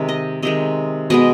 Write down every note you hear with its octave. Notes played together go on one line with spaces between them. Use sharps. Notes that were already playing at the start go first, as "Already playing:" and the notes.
Already playing: C3 D#3 G#3
D#5
C3 D#3 G#3 D#5
B2 G#3 B3 D#5